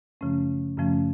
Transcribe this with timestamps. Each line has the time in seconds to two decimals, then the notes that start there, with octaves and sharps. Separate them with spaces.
0.21 F#2 C#3 F3 A3 C#4
0.77 F#2 C#3 F3 A3 C#4